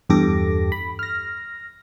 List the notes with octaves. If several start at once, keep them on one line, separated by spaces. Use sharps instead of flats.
E2 G2 G4 A4 D6 A#6
B5
F6 A#6